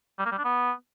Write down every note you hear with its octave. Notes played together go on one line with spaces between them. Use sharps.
G3
A#3
G3
D4
B3